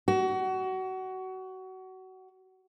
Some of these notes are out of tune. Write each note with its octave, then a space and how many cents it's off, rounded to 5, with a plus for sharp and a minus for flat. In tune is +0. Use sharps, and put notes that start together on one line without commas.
F#4 +25